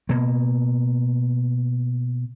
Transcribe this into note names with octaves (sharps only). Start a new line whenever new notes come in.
B2 A#3